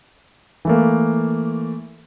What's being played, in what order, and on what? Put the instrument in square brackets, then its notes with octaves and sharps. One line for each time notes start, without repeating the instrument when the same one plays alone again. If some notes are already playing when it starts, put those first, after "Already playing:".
[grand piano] E3 A3 A#3